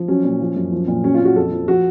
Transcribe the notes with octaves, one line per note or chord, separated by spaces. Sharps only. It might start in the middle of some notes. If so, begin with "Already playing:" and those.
Already playing: F3
F#3 C#4
A#2
F3
F#2
F3
A#2
F#3 C#4
A#2 F4
F#4
F2 A4
F3
F3 F#4